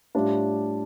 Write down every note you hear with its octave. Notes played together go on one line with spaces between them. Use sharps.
A2 G3 D4 F4